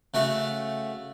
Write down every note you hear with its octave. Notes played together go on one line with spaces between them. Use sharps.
C#3 A3 F#4